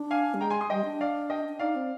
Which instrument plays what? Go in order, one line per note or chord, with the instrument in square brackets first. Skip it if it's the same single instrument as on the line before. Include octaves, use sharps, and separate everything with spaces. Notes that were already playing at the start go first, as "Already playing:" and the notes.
Already playing: [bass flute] D4
[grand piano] F5 G#5
[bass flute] G3
[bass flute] G#3 [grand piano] G5 A#5
[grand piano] G#5 C6
C6 D#6
[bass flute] G3 [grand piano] D#5 G5
[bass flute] D4
[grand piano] D5 F5
D#5 G5
[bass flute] D4
[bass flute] D#4 [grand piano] D5 F5
[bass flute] C4